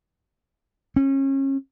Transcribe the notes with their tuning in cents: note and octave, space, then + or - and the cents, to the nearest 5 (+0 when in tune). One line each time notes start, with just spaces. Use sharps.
C#4 -30